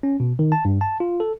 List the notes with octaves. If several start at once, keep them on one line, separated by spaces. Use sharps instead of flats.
C#4
B2
D#3
A5
G2
A5
F4
A4